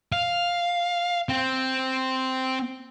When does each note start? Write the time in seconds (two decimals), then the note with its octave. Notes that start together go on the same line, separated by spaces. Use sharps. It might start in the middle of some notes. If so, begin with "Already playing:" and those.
0.12 F5
1.29 C4